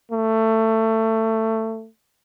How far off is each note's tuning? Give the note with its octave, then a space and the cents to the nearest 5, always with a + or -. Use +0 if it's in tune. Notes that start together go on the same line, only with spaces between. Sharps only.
A3 +20